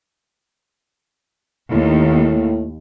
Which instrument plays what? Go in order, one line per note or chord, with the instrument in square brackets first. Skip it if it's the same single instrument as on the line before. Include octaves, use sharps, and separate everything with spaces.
[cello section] D#2 [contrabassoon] A2